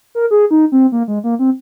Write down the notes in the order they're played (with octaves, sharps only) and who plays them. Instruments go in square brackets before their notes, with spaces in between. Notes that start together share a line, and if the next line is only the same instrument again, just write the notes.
[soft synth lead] A#4
G#4
D#4
C4
A#3
G#3
A#3
C4